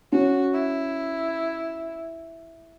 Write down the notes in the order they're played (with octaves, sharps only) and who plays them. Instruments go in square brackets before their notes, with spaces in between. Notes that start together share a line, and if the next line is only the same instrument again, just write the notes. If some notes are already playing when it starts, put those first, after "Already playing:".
[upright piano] C#4 [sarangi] F#4
[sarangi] E4